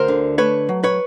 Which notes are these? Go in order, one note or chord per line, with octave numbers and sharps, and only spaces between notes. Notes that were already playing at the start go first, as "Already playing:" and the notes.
Already playing: D2 A#4 C5
D3
A3 B4 C#5
F#3
B4 C#5